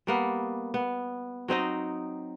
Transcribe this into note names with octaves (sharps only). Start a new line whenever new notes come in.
G3 A#3 B3
B3
F#3 C4 D#4 D#5